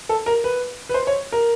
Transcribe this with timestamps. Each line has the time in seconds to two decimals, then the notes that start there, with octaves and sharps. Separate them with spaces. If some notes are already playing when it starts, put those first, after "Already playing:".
0.09 A4
0.26 A#4
0.44 B4
0.89 B4
0.94 C5
1.07 C#5
1.32 A#4